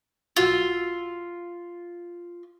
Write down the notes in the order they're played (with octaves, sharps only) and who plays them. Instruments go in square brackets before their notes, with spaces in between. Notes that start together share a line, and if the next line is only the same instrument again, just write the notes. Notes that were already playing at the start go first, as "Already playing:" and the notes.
[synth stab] B1 F#4 E6 [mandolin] F4